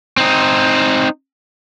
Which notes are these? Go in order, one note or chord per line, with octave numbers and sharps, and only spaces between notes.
C4 D#4